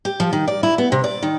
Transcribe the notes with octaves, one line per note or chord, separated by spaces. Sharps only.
G4
F3
D#3
D5
E4
B3
C3
D5
D#3